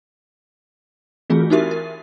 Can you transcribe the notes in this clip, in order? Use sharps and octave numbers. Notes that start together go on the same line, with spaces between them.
E3 A3 C4 F4 F#4 G#4
D#4 E4 F#4 G4 A#4 E5
A#4